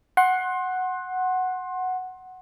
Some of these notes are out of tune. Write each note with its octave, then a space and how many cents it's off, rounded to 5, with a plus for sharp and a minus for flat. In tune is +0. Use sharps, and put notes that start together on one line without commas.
F#5 +0 C6 +25